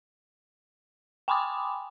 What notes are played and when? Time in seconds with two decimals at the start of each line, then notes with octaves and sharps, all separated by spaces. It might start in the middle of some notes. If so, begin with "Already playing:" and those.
1.28 G5 G#5 B5 C6 D6 D#6